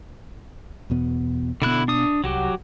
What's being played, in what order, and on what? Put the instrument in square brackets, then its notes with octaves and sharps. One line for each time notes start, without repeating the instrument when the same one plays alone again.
[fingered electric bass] E2 B2 B3
[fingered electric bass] B2 B3 [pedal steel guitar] D3 E4 F#6
[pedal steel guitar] D4 D#6
[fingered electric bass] C2 [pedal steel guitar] F#3 F#4 G4